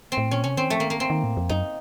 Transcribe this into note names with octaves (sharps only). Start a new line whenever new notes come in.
C4
A2
A#2 C#4
C3 C#4
D#3 C4
F3 A3
D#3 A#3
A#3
C4
D#3
A2
F2
F#2 D#4